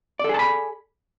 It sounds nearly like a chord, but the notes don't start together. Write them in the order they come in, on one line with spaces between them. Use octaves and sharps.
D5 A4 G#4 A5 B5